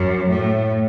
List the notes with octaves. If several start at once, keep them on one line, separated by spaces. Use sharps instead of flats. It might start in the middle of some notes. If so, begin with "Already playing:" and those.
Already playing: F#2
A2